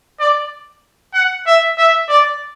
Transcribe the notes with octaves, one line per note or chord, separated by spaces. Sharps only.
D5
F#5
E5
E5
D5